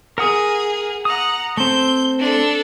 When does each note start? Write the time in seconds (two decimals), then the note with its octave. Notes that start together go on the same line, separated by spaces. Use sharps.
0.18 G#4 A#4 F#5 D#6
1.05 F#5 A#5 D#6
1.57 A3 C4 G6
2.19 D4 A4